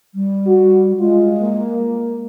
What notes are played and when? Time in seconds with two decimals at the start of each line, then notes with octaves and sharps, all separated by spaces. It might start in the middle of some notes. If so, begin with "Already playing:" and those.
0.15 G3
0.47 F#4
1.00 G#3 F4
1.42 A#3